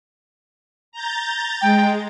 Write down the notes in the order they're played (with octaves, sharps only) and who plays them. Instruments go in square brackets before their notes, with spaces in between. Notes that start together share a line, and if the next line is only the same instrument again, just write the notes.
[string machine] A#5 G6 A6
[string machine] G#3 [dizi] G5